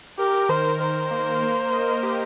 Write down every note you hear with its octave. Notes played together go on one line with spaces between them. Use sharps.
G4 A#4
A#4
D#3 C5
A#4
D#3 C5
A#4
A#3
A#4
A#3
A#3
D#5
A#3
G4